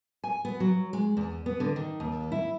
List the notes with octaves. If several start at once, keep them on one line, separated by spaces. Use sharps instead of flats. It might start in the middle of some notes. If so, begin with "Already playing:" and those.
G#5
B3
F#3
G#3
E2
B3
D3
D#3
D#2
E4